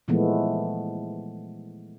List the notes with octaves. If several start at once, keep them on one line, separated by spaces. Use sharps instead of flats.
A#2 E3 F3 G#3 A3 B3